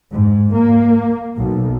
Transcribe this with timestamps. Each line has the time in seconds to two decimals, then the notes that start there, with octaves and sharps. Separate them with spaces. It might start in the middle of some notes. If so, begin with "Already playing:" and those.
0.11 G#2
0.53 A#3
1.38 B1